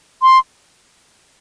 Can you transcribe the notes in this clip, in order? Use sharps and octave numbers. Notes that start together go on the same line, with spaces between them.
C6